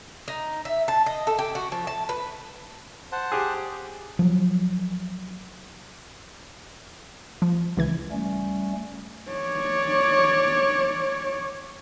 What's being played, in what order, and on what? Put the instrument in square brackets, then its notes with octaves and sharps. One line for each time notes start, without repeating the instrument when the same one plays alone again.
[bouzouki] D#4
E5
A5
D#5
A4
G4
F#4
F3
A5
B4
[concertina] C5 F#5 A5
[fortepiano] G4 G#4
[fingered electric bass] F3 F#3
[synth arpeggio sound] F3
C#2 E3 G#6
[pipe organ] G3 A3 C#4
[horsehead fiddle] C#5 D5